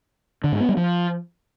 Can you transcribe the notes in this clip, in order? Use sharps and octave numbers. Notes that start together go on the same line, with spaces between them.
D3
G#2
B3
G3
F3